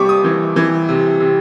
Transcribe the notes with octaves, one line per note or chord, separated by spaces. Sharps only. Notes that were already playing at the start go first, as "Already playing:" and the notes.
Already playing: C3 G3 C#6 D6
D#6
E3
E3
C3
C3